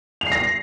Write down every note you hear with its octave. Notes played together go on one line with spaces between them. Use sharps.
F7
C7
A#6